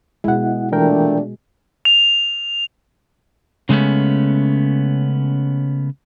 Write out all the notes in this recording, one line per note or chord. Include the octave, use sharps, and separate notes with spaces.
B2 G#3 E4 F#5
A#2 E3 A3 D4 A#4 G5
F7
C#3 G#3 A3 B3 C#4